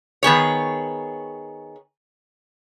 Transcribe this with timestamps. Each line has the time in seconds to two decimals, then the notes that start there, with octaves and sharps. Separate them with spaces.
0.23 D#3 B3 G#4 C#5